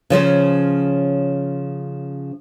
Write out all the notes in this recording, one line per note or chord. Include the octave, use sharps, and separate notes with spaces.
C#3 F3 C#4 C5